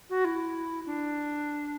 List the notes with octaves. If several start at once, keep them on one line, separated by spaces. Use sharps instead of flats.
F#4
E4
D4